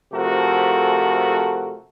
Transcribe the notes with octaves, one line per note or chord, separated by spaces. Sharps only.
C3 F3 A3 F#4 A4 A#4